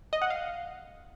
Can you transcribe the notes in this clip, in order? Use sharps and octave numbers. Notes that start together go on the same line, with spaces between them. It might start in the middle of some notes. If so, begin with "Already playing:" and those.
D#5
F#5
F5